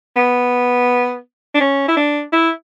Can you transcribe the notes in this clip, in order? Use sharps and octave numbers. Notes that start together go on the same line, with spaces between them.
B3
D4
C#4
E4
D4
E4